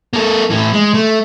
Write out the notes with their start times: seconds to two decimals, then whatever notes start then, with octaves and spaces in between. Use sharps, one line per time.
0.13 A#3 A4
0.50 A2 E3
0.73 G#3
0.94 A3